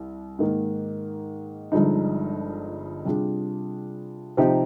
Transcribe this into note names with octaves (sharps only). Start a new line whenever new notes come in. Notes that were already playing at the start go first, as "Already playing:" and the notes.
Already playing: C2
G#2 D#3 A#3
G1 G2 F3 G#3 D#4
C3 G3 D4 F4 G#4
C3 F3 C4 D#4 G4